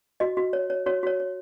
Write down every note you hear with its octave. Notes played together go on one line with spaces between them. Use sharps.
F#4 D#5
F#4
C#5
C#5
F#4 C#5
F#4 C#5
C#5